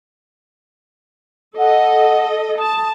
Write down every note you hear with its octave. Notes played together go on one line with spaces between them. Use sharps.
A4 D#5 F#5
A5 D#6